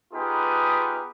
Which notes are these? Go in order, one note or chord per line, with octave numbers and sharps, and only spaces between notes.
B3 D#4 F4 G4 G#4 B4